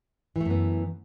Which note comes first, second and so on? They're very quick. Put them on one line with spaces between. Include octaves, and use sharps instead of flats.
E3 A3 F#2 B3